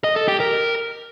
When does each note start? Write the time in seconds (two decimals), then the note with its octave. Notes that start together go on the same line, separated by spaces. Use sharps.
0.04 D#5
0.16 A4
0.28 G4
0.40 A#4